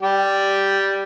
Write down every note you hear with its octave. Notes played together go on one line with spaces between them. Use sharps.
G3 G4